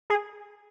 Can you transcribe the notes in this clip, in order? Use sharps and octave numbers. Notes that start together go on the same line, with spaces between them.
G#4